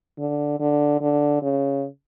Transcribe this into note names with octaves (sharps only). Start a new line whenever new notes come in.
D3
D3
D3
C#3